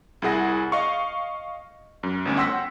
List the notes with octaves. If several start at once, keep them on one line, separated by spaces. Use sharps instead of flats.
C2 E4 G#4 F#5 A#6
D#5 F5 C#6
F#2
G1 D2 C#4
F#5 G5 C6 E6 A#6 B6